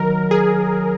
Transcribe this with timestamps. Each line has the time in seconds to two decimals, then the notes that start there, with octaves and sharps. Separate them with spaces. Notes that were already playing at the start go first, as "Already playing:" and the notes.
Already playing: D#3 F#3 A#4
0.31 G#4